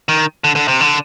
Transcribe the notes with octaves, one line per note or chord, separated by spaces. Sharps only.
D#3
D3
D3
C3
D3